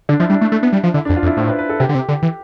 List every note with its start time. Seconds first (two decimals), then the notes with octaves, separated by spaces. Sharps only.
0.09 D3 D4
0.20 F3 E4
0.30 G3 D4
0.41 A3
0.52 A3
0.63 B3
0.73 G3
0.83 F3
0.94 D3 E4
1.05 D4
1.09 F2
1.16 F4
1.23 F2
1.27 E4
1.37 A2 C5
1.49 B4
1.59 B4
1.69 A4
1.80 C3 G4
1.89 D3
1.95 C3
2.09 D3
2.22 E3